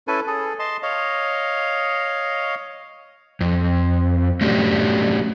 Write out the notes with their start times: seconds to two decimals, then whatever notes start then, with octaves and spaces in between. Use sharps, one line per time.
0.08 C#4 E4 A4 B4 G#5
0.27 G#4 A4
0.59 D#5 A5 C6
0.83 C#5 D#5 F5
3.41 F2
4.41 F#3 A3 C#4 D4 G4